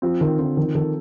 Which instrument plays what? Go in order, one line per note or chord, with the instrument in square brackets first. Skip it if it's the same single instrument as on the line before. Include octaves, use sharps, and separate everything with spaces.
[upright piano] F3 [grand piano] C4
[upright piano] D#3 [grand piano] F4
[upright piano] D3 [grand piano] C4
[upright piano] D#3 [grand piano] F3
[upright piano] D#3 [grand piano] A4